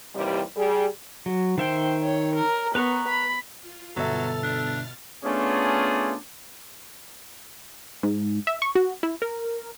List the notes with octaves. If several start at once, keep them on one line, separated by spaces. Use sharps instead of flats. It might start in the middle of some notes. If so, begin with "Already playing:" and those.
D#2 C3 E3 G3
G3 G#4
F#3
D#3 C5 E5 G5
C#5
A#4
B3 B4 A#5 C#6
B5
F4
G1 B2 F#3 A4 E5 F6 A6
D4
A3 B3 C#4 D4 F4 G#4
G#2
E5
C#6
F#4
E4
A#4